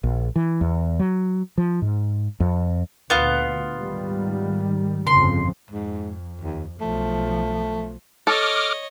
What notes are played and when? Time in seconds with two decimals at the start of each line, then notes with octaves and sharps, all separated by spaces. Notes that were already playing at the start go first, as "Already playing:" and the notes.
0.04 A#1
0.36 E3
0.61 E2
1.00 F#3
1.58 F3
1.82 G#2
2.40 F2
3.10 D2 A#2 B3 F4
3.74 G#2 D#3 G3
5.07 G1 F2 C#3 C6
5.71 F2 G#2
6.42 D#2
6.81 B1 F3 A3
8.27 A4 C#5 D#5 D6 F6